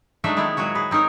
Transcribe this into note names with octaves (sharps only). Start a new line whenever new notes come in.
F#3 G#3 A3 D4 D#4 E5
D#3 G#3 B3 C4 E4
A#2 F#3 G#3 F#4 C#5
G#4 B4
C4 D#4 G#4 A#4 C#5